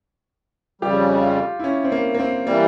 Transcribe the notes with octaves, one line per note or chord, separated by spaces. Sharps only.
F2 C#3 G3 G4
F4
E4
C#4
C4
A#3
A#3
C4
E3 G3 A#3